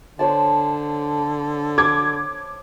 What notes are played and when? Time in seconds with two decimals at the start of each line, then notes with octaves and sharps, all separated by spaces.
0.19 D3 C5 C#5 A5
1.78 D6 G#6